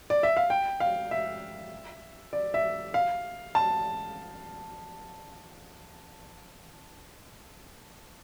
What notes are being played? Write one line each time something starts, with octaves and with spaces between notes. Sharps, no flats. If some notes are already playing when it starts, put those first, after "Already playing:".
D5
E5
F5
G5
F5
E5
D5
E5
F5
A5